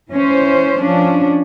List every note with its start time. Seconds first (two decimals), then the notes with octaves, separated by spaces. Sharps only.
0.10 E3 C#4 C5
0.81 F3 C#4 D4